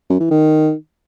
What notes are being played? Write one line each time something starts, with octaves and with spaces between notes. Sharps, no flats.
F#2
E3
D#3